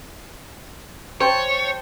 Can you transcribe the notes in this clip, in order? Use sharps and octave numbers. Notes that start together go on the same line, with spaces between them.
C5 C#5 G5 A5